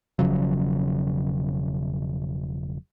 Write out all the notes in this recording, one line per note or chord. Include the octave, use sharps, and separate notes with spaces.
E1 C#3 F3 F#3